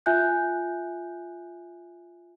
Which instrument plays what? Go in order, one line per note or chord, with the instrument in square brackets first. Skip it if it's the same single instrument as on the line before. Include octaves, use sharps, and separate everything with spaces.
[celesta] F4 E5 G#5 F#6 G6